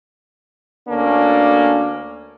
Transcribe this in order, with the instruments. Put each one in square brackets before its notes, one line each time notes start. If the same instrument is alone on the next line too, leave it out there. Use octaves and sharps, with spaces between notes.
[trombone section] D2 A#3 C#4 D4 A4